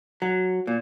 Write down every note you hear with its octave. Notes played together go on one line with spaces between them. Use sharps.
F#3
A#2